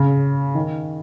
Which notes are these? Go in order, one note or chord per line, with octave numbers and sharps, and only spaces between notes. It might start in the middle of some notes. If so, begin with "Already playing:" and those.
Already playing: C#3
D#3